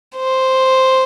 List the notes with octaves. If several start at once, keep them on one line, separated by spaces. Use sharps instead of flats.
C5